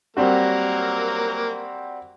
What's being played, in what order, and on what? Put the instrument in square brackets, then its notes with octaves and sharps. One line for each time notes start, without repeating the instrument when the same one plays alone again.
[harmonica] F#3 A#3 A#4 [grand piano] G3 C4 F#4